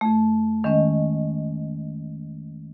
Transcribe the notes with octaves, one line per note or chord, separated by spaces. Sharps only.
F2 A3
D#3 G#3 C#4 D#5